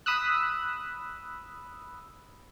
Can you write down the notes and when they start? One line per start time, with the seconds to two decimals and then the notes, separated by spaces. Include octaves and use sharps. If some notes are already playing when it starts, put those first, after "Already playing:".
0.06 B5 D#6 E6 F#6